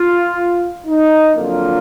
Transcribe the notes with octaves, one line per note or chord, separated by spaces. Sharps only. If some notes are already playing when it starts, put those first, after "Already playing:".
Already playing: F4
D#4
F2 D3 F#3 A#3 F4